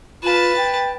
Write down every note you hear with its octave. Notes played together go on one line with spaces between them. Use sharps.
F4 B4 A5
G5